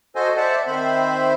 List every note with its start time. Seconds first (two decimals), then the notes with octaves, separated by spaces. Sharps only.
0.16 F#4 A4 C5 D#5 G#5
0.37 C5 D5 E5 F#5 A5
0.67 D#3 C4 C5 E5 B5